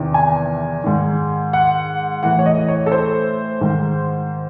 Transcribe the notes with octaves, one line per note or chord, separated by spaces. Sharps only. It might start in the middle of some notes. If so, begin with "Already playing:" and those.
Already playing: E2 C3 D#3
G#5
G#2 D#3
F#5
A2 E3 F#5
C#5
D#5
C#5
A4
C5
G#2 D#3